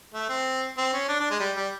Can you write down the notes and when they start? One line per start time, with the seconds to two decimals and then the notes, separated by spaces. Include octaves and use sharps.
0.14 A3
0.29 C4
0.78 C4
0.93 C#4
1.08 D4
1.20 D4
1.30 G#3
1.40 G3
1.57 G3